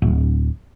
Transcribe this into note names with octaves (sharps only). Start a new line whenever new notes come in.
D1